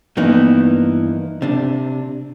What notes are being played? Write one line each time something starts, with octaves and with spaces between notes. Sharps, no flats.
G2 E3 A#3 B3 D#4 E4
C3 D4